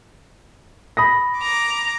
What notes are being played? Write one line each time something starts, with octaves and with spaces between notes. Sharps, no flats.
B5 D#6 A#6
A#5 D6